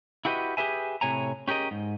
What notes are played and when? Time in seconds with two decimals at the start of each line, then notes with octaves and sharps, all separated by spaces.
0.25 E4 F#4 G4 B4 D#5
0.57 G4 G#4 B4 E5 G#5
1.01 A2 C3 C#5 G#5 A#5
1.48 C#4 G4 G#4 A#4 D#5
1.71 G#2